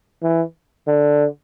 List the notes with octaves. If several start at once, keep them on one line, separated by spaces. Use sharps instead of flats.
E3
D3